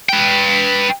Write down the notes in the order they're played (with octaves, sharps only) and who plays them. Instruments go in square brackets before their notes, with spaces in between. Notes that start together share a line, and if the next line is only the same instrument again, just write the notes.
[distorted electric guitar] B4 G5